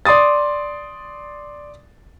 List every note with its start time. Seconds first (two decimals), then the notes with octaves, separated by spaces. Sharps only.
0.05 D5 C6 D6 D#6 A6